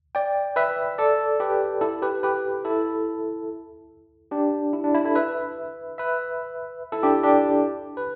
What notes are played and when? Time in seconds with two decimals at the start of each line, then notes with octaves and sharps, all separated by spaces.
0.15 D5 G5
0.56 B4 E5
0.98 A4 D5
1.40 G4 B4
1.81 E4 A4
2.02 G4 B4
2.23 G4 B4
2.65 E4 A4
4.31 D4 G4
4.73 E4
4.84 D4
4.95 E4
5.05 E4 A4
5.15 B4 E5
5.98 B4 E5
6.92 E4 A4
7.03 D4 G4
7.23 D4 G4
7.97 B4